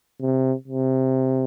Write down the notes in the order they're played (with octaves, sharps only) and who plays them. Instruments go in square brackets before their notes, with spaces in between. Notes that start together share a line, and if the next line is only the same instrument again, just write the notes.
[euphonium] C3
C3